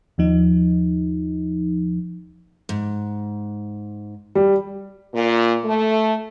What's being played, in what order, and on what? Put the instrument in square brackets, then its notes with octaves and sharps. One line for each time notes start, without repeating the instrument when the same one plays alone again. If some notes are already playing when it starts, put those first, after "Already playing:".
[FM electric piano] D#2 F3 D#4
[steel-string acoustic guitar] G#2
[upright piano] G3
[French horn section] A#2
A3